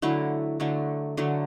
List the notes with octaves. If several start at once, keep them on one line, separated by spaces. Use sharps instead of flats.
D3 F#3 A3 E4
D3 F#3 A3
D3 F#3 A3